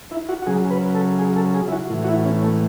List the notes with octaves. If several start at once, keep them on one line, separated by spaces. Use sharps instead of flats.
E4
F#4
F#4
C#3 F#3 G#4
B4
A4
G#4
A4
G#4
E4
F#4
A2 E3
F#4
E4
C#4
A3